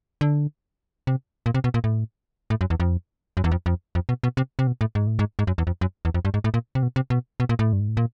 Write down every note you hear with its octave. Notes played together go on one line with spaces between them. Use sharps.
D3
C3
A#2
C3
B2
A#2
A2
A2
F#2
E2
F2
F#2
E2
F2
F2
F2
B2
B2
C3
C3
B2
A2
G#2
A2
G#2
G#2
F#2
E2
F2
F#2
E2
F2
G2
G#2
A2
A#2
C3
B2
C3
B2
B2
A#2
A2
G2
G#2
A2
A#2